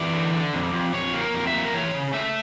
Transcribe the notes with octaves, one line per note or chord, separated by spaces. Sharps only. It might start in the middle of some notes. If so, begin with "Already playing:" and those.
Already playing: E3 D5
D3
D3
F2
F2
F2 C#5
A#3
A#4
F2
E5
A#3
A#4
E3 C#5
C#3
A3 E5